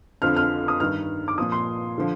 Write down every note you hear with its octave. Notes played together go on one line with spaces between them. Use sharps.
F2 D3 F3 F6
F6
D#6
G2 D#3 F6
D6
A#2 F3 D#6
C6
D3 F3